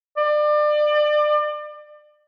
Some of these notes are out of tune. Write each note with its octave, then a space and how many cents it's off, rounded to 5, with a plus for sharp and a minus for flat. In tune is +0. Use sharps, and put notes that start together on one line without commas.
D5 +30